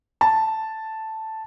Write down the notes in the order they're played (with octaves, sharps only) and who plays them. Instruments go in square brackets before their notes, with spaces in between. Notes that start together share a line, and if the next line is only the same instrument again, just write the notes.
[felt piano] A5